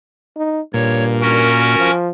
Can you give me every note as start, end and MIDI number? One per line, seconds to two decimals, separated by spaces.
0.37 0.60 63
0.74 1.46 43
0.74 1.76 46
0.74 1.04 73
1.22 1.91 61
1.22 1.91 66
1.22 1.91 70
1.79 2.11 53